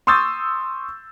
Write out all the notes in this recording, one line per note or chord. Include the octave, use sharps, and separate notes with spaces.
C6 C#6 D#6 E6 G6 A6